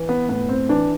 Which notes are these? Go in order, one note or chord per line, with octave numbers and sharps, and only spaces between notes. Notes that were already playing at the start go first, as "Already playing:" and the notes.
Already playing: E3
B3
A2 B3
C4
E3 D4